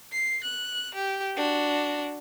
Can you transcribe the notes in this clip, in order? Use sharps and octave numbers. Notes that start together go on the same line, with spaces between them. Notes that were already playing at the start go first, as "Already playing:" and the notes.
C7
F#6
G4
D4 F#4